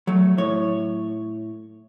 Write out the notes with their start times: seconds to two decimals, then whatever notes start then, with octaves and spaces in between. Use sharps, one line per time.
0.07 F#3 A3
0.38 A2 C#5